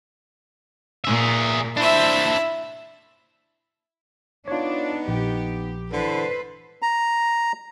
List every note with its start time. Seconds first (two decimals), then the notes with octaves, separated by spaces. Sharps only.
1.05 A#2 G#4 E5
1.77 D4 E4 C5 E5
4.48 B3 D4 D#4 F4 C#5
5.08 A#1 G4
5.92 D3 E3 A4 B4 C5
6.82 A#5